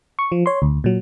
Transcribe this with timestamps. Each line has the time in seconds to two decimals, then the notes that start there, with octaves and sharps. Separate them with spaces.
0.19 C#6
0.32 F3
0.46 C#5 C6
0.62 D2
0.84 A#2 F#3